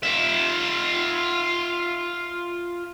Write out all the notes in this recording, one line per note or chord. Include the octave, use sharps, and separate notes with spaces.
F4 E5